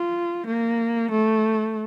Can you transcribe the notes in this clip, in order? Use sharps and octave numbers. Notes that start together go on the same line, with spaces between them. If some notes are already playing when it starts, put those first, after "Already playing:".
Already playing: F4
A#3
A3